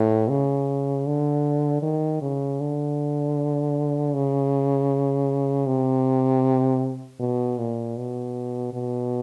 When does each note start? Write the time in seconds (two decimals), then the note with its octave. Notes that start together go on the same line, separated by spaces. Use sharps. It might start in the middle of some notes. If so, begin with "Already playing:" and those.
Already playing: A2
0.30 C#3
1.07 D3
1.83 D#3
2.22 C#3
2.60 D3
4.14 C#3
5.67 C3
7.20 B2
7.58 A#2
7.97 B2
8.73 B2